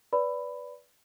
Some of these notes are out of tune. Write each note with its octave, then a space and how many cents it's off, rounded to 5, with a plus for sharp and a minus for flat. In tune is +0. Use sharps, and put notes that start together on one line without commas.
B4 +0 D5 -15 B5 +10